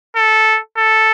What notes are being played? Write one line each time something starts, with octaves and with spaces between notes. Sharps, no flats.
A4
A4